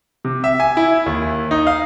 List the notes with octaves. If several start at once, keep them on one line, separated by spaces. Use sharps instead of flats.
C3
E5
G#5
E4
D#2
D#4
F5